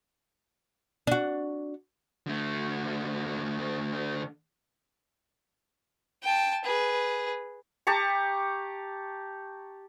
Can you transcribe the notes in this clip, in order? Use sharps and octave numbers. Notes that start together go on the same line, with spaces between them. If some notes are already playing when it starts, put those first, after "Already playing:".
D4 F#4
D3 A3
G5 A5
G#4 B4
G4 A5 A#5 C#6